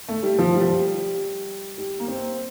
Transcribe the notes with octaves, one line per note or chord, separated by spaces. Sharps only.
A3
G3
F3
G3
F3
G3
G3
A#3
C4